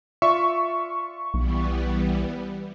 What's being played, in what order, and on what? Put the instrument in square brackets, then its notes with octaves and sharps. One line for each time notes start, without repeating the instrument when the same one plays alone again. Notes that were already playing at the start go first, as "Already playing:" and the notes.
[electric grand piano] F4 D5 E5 [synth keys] C#6
[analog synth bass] B1 [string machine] E3 G3 B3